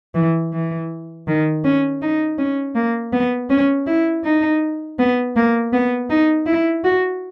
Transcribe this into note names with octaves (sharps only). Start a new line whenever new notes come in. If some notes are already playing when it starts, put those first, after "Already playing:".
E3
E3
D#3
C#4
D#4
C#4
A#3
B3
C#4
E4
D#4
B3
A#3
B3
D#4
E4
F#4